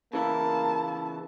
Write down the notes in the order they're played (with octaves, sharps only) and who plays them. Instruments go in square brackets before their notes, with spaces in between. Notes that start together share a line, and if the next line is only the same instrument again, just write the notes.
[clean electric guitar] C#3 E3 E4 [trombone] A#3 [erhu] A5